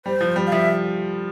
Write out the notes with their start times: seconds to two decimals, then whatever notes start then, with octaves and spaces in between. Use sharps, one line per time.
0.06 G3 C5
0.21 F3
0.36 G3
0.47 F5
0.52 F3 E5